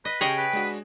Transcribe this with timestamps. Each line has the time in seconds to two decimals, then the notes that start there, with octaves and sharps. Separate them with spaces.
0.05 B4 D#5
0.21 C#3 G4 G#4 C#5 D#5 G5
0.37 B4
0.53 G#3 D4 F#4